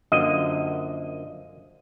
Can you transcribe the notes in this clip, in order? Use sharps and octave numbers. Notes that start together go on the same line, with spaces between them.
F#2 D3 F3 A#3 D#5